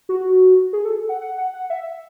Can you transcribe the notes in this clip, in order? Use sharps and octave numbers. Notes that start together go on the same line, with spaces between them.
F#4
G#4
A4
F#5
F#5
F#5
F#5
E5